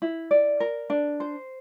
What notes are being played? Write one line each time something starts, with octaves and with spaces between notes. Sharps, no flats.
E4
D5
A#4
D4
C5